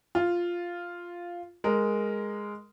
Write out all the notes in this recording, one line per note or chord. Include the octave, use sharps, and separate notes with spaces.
F4
G#3 A#4